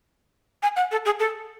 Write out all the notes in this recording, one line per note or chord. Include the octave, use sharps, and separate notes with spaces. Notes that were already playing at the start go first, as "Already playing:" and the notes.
G#5
F#5
A4
G#4
A4